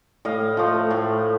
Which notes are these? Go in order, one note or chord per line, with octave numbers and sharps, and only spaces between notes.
A2 D#5 F5
F3 A3
A2